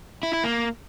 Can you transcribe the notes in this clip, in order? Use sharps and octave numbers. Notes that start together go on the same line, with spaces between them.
E4
E4
A#3